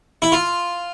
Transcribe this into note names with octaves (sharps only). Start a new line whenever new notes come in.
E4
F4